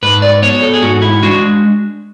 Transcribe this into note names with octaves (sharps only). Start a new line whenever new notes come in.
G#2 B4
D5
F#3 B3 C#5
A4
G#4
G#2 F#4
E4
G#3 D4 F#4